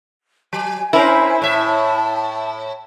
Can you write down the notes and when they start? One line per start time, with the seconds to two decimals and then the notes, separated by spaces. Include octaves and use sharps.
0.53 F#3 G#5
0.93 C#4 E4 A#4 C5 E5 G#5
1.42 A2 E5 A5